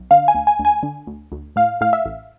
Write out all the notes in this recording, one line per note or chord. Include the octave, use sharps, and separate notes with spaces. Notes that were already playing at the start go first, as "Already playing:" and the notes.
Already playing: B1
D3 F5
G#5
D2
G#5
D2
G#5
D3
D2
D2
A2 F5
A2 F5
E5
A1